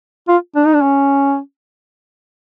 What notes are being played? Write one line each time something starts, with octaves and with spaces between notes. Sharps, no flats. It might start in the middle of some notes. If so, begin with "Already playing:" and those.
F4
D4
D#4
D4
C#4